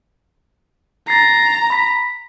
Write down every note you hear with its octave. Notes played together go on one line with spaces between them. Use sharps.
A#5 A6 C7
B5 B6